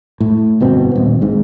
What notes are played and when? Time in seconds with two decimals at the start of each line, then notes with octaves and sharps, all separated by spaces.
0.20 A2
0.61 G1 B2 C4
0.96 D#1
1.21 G#1 G#2